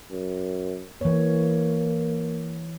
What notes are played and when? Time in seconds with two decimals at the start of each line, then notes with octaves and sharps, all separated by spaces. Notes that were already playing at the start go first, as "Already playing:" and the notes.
0.11 F#2
1.01 E3 A#3 C#5